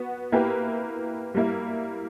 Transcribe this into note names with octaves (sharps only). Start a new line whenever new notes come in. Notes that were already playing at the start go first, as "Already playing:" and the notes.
Already playing: B3 F#4
A#3 E4 G4 B4
G3 A#3 E4